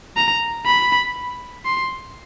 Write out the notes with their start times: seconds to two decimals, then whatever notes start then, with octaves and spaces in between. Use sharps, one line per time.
0.16 A#5
0.66 B5
1.65 C6